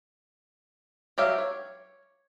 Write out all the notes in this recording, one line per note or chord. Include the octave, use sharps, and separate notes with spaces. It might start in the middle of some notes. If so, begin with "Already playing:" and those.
F#3 G4 E5 F5
C#5